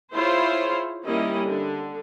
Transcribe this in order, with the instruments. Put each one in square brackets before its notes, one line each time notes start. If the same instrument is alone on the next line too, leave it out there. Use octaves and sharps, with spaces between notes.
[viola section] E4 F4 G#4 C5 C#5
D#3 G3 A#3 C#4 E4 D#5
D3